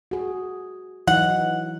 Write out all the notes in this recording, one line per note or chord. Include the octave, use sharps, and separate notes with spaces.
F#4 G#4
E3 F#3 D#4 F#5